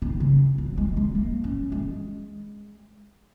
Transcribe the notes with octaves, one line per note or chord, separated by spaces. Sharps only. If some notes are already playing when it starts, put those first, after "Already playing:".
D#3
C#3
F#3
G#3
G#3
A#3
C#4
G#3